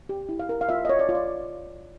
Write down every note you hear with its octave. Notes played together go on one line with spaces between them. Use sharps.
G4
E4
F5
A#4
F5
F4 E5
D#5
C#5
D5
F4
D5